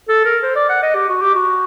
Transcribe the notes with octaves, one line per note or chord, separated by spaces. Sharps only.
A4
A#4
C5
D5
F#5
D#5
G4
F#4
G4
F#4